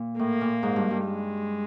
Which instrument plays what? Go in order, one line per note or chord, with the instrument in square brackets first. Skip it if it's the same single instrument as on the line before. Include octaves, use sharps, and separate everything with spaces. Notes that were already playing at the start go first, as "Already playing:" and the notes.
Already playing: [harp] A#2
[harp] A2 [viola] A#3
[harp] A#2
G#2
G2
G2
[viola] G#3